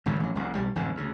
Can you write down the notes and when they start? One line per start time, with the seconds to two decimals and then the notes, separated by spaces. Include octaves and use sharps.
0.06 G#1 C#2 F#2 C#3
0.20 A1 F#3
0.35 F1 C2 F2
0.55 B1 G3
0.75 A1 F2 G#2 D3
0.95 D2 C#3